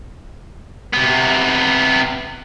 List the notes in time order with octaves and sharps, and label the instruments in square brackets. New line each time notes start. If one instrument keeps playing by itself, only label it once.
[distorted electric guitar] C3 B3